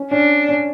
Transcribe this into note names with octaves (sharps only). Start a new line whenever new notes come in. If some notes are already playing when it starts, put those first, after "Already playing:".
Already playing: C#4
C#4 D4
C#4